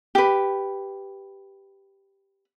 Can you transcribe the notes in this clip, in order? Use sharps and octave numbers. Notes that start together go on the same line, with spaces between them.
G4 B4